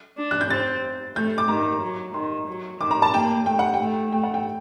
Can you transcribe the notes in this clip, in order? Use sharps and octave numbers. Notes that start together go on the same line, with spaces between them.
D4
F#6
G6
C4 A6
A3 G6
D6
D#3 A#5
F#3
D#3 C6
F#3
D#3 D6
A#5
A5
A#3 G5
A3 G5
F#5
G5
A3
A3 G5
F#5
G5